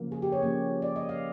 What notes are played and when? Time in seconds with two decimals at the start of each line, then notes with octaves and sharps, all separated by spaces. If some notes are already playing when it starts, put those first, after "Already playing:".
Already playing: C#3 F3 A#3
0.12 G#4
0.22 G4
0.32 C#5
0.42 F3 A#3 C#4
0.82 D5
0.96 D#5
1.09 F5